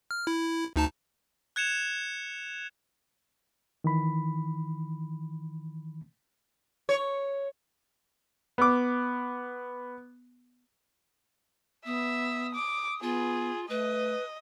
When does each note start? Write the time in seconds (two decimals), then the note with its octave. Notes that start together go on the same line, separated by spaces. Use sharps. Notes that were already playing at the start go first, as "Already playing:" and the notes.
0.11 F6
0.27 E4
0.76 D2 D#4 A5
1.56 F#6 G#6 C#7 E7 F7
3.84 D#3 E3 B5
6.89 C#5
8.58 B3 D6
11.86 B3 E5 D#6
12.54 D6
13.02 B3 F4 G#4
13.69 A3 B4 D#5